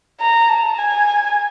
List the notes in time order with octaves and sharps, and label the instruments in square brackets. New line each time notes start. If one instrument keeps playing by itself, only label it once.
[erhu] A#5
A5
G#5